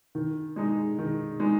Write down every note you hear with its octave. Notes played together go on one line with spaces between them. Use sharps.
D#3
G#3 D#4
D#3
G#3 D#4